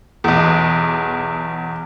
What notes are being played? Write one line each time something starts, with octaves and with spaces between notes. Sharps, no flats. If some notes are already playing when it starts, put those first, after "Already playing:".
B1 E2